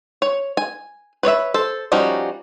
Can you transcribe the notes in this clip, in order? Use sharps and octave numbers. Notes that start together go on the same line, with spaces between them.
C#5
G#5
B4 C#5 D5 E5
A4 C5
F3 G3 C#4 D#4 F#4